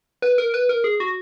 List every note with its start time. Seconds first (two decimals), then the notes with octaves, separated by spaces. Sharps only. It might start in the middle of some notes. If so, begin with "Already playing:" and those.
0.22 B4
0.38 A#4
0.54 B4
0.69 A#4
0.84 G#4
1.00 F#4